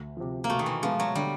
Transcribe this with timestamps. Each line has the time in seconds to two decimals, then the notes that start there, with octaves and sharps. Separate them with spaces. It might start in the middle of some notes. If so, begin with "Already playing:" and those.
Already playing: D2
0.17 C3 F3
0.44 A#3
0.50 B2 A3
0.59 D#3
0.66 E3
0.83 F3 G#3 B3
1.00 F#3
1.15 D3 G3